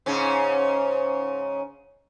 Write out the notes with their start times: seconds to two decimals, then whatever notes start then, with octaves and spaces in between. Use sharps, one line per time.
0.06 G#2 C#3 C#4